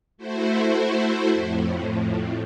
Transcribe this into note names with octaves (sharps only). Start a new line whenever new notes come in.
A3 E4 F#4 C5
F2 A2